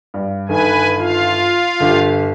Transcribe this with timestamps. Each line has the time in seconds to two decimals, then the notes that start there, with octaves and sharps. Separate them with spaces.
0.14 G2
0.49 G1 D#3 B4 G#5
0.99 F4 F5
1.80 G1 D3 G4